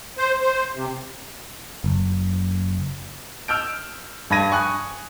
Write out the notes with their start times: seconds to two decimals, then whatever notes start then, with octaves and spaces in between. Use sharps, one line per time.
0.18 C5
0.41 C5
0.76 C3
1.84 F#1
3.48 E6 F6 G6 D7
4.30 G2 A5 B5 G#6 A#6 D#7
4.52 G#5 C#6 D#6 F#6